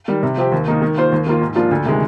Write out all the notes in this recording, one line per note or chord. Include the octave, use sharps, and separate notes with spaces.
D#3 G3
C3
F3 C4 G4
D#2
D#3 A#3 D#4
D#3
A#3 F4 C5
D#2
D#3 A#3 F4
G#2
F3 A#3 D4 F4
D2
C3 D#3 G#3